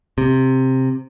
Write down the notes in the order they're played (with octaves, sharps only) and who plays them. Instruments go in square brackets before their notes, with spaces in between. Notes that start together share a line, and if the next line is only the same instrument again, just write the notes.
[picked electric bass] C3